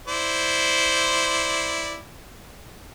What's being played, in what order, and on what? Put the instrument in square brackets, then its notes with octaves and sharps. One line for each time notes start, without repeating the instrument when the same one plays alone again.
[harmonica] E4 C5 D5